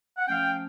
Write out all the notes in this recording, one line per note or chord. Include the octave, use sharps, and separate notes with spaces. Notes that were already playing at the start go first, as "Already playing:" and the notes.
F#5
F3 A3 C#4 F5 G5